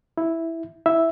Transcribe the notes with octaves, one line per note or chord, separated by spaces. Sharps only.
E4
E4 E5